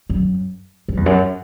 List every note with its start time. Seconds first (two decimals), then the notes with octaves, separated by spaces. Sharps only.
0.10 F#2
0.88 F#2
0.97 E2
1.06 F#2